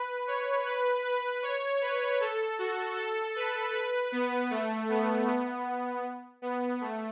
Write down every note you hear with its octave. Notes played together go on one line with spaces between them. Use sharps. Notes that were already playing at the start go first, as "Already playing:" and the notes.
Already playing: B4
C#5
B4
B4
C#5
B4
A4
F#4
A4
B4
B4
B3
A3
B3
B3
B3
A3